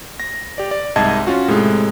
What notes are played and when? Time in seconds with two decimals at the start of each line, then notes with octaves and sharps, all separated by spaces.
0.20 A#6
0.58 G4 D5
0.71 D5
0.96 C2 G#2 D#5 E5 A5 G#6
1.27 C#4 F4 F#4
1.48 A2 C3 G#3